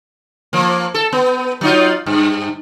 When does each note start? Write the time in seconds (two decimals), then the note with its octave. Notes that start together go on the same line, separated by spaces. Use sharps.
0.53 F3 A#3
0.94 A4
1.13 B3
1.61 F#3 D#4 F4
2.06 G2